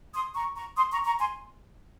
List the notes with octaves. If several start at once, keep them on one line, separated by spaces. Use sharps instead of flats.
C6 D#6
A#5 C#6
A#5 C#6
C6 D#6
A#5 C#6
A#5 C#6
G#5 C6